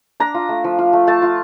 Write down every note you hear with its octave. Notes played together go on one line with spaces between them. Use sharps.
D4 A#5
F4
A3
F3
F4
A3
A3 A5
F4